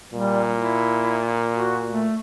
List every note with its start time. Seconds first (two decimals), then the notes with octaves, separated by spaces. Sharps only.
0.14 A#2 G3
0.55 E4
1.54 F#4
1.88 A3